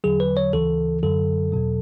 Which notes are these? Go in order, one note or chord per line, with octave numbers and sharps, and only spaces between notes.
E2 D3 F#3 G#4
B4
C#5
D2 C#3 E3 A4
F#2 D3 F#3 A4
E2 B2 F#3